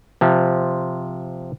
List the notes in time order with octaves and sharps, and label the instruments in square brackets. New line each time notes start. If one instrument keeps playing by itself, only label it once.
[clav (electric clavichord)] C3 F3